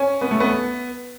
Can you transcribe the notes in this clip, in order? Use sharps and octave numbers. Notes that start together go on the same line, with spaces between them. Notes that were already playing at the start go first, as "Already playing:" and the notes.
Already playing: C#4
B3
A3
B3